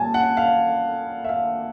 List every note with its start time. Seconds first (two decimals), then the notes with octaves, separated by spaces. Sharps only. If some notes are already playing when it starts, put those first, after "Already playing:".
Already playing: A#2 G3 G#5 A5
0.14 F#5
0.37 F5
1.24 E5
1.29 F5